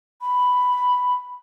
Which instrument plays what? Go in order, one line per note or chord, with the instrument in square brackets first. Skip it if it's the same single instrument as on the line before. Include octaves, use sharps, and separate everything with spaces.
[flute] B5